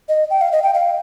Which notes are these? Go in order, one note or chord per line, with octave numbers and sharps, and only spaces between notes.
D#5
G5
F5
D#5
G5
F5